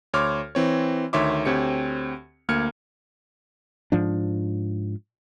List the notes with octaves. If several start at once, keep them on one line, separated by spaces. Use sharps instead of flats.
D2 C#5 C6 D6 F6
E3 C4 C#5
D2 D#3 C#5 E5 C6 D6
D2 C4 G4 C#5 C#7
D2 A#3 F6 G#6 C#7
G#2 F3 D4